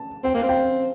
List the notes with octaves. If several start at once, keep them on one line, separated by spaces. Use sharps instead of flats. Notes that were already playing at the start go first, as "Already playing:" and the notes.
Already playing: A5
C4 G5
A#3 F5
C4
G5